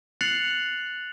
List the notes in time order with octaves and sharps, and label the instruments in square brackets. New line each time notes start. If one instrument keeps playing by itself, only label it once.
[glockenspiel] F#6 A6 C7 C#7 F7 F#7